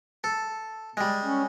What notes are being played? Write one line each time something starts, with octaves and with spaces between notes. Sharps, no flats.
A4
G3 G#3
C#4